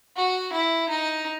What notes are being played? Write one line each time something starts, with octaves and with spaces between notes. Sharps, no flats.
F#4
E4
D#4